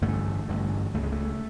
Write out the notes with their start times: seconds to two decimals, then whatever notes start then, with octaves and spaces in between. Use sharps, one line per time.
0.02 A1 G2 D3 A3
0.48 A1 G2 D3
0.94 C#2 C#3 A3
1.03 G#3
1.12 A3